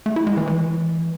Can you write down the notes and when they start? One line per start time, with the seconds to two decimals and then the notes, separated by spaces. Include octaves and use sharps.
0.06 A3
0.16 E4
0.27 G#3
0.37 E3
0.47 E3